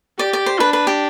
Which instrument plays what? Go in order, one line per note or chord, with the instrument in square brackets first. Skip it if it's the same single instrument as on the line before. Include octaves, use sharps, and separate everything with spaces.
[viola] G4 [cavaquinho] D5
[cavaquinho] D5
C5
[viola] D4 [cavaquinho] B4
[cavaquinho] B4
G4